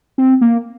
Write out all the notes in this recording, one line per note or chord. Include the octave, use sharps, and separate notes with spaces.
C4
A#3